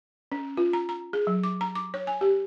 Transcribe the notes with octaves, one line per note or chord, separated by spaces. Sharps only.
C#4
F4
A#5
A#5
G#4
F#3
D6
A#5
D6
C#5
G#5
G4